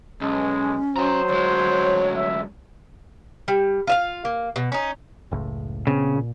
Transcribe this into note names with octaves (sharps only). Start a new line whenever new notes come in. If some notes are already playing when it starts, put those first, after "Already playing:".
B1 G#3 C#4
F#3 C5 G5 A#5
D2 G#3 C#5
E5
G3
F4 E5 F5
A#3
B2
C#4 D#4
F#1 C#2 A2
A#2 C#3 B3 C4
A#2